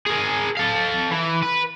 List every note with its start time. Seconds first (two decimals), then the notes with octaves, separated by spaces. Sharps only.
0.06 G#4 A#4
0.57 A4 F5
1.11 E3
1.42 B4